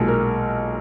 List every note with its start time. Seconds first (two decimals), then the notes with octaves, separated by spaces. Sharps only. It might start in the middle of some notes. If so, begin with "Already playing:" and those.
Already playing: B1 A#2 G#3
0.08 A#4